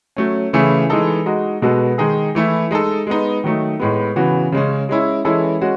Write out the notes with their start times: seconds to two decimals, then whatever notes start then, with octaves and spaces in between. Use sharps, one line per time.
0.17 F#3 A3 C#4
0.53 C#3 E3 A3 E4 G#4
0.90 E3 G#3 D#4 A4
1.26 G#3 D#4 F#4
1.62 B2 G#3 B3 F#4 A4
1.98 D#3 G#3 D#4 G#4
2.35 E3 A3 E4
2.71 G#3 D#4 A4
3.07 G#3 B3 D#4
3.44 D#3 F#3 A3 D#4
3.80 A2 G#3 B3
4.16 C#3 E3 B3 F#4
4.52 C#3 G#3 C#4
4.89 G#3 C#4 E4
5.25 E3 G#3 C#4 E4 A4
5.61 G#3 C#4 F#4